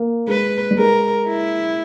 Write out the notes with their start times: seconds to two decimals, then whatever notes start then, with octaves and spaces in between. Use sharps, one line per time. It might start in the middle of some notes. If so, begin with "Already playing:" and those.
Already playing: A#3
0.27 G#3 B4
0.71 G3
0.78 G#3 A#4
1.27 E4